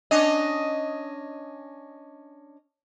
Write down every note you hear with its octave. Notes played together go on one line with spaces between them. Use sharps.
C#4 D4 D#5